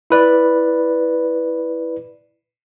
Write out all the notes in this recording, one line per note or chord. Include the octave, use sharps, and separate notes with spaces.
E4 B4 D5